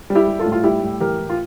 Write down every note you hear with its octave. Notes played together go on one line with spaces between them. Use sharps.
G3
E4 G4
G3
F4 A4
A2
F4
G3 E4 G4
A2
E3 G4 A#4
A2
F4